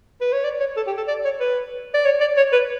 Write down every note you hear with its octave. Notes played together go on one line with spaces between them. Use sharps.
B4
C#5
D5
C#5
A4
G4
A4
D5
C#5
B4
D5
C#5
D5
C#5
B4